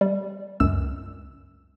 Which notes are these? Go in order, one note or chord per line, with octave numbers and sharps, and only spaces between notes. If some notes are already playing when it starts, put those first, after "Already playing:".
G3
C#2 F#2 E6